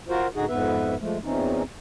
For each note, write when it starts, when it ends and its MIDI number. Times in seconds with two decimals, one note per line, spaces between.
0.09 0.28 65
0.09 0.28 66
0.09 0.28 70
0.09 0.28 72
0.35 0.45 45
0.35 0.45 50
0.35 0.45 63
0.35 0.45 66
0.35 0.45 68
0.49 0.95 41
0.49 0.95 44
0.49 0.95 59
0.49 0.95 71
0.49 0.95 76
1.00 1.18 53
1.00 1.18 56
1.00 1.18 57
1.24 1.63 40
1.24 1.63 46
1.24 1.63 52
1.24 1.63 60
1.24 1.63 61
1.24 1.63 63